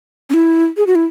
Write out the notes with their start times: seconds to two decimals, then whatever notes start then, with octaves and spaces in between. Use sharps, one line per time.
0.30 C#4
0.34 E4
0.77 G#4
0.87 F#4
0.95 E4